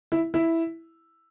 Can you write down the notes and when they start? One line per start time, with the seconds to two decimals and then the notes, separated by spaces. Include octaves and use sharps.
0.12 E4
0.34 E4